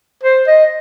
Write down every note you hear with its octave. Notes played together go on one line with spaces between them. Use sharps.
C5
D#5